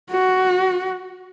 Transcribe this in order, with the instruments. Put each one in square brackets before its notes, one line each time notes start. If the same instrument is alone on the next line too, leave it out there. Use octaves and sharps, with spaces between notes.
[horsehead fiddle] F#4